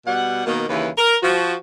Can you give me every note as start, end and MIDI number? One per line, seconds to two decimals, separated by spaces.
0.06 0.44 47
0.06 0.44 55
0.06 0.44 78
0.46 0.63 47
0.46 0.63 51
0.46 0.63 58
0.69 0.89 39
0.69 0.89 49
0.69 0.89 52
0.69 0.89 71
0.97 1.15 70
1.22 1.54 53
1.22 1.54 66